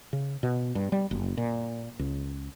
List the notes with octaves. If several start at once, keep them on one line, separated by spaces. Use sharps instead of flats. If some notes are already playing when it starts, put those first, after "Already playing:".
C#3
B2
G2
G3
F#1
A#2
C#2